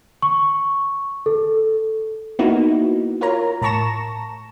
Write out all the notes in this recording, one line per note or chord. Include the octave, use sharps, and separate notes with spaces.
C#6
A4
A#3 B3 D#4 E4 F#4
F4 A#4 C#5 A#5
A2 A5 A#5 C#6 A#6 E7